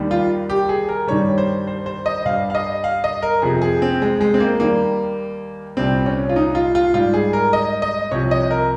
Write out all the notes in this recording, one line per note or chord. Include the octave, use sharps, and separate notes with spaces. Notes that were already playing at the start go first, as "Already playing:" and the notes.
Already playing: D#2 D#3 G3
F4
G4
G#4
A#4
G2 D#3 G3 C#5
C5
C5
C5
D#5
G2 G3 F5
F5
D#5
F5
D#5
A#4
F2 C3 F3 G#4
G#4
C4
G#3
G#3
C4
A#3
D#2 D#3 G3 A#3
C2 A#2 G3 C4
C#4
F4
D#4
F4
F4
G#2 G3 F4
G#4
A#4
D#5
D#5
C2 C3 F3 C#5
D#5
A#4